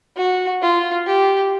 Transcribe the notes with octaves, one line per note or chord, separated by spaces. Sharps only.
F#4
F4
G4